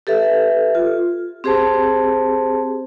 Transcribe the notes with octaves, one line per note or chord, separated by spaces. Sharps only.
G4 A4 B4 E5
F4
C4 G4 G#4 C5 A5